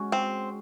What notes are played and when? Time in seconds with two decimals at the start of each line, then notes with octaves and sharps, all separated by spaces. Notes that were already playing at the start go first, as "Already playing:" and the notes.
Already playing: G#3 C#4 F#4
0.12 C4